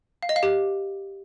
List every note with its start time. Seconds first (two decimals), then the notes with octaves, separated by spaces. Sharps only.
0.23 F5
0.29 D#5
0.36 F5
0.43 G4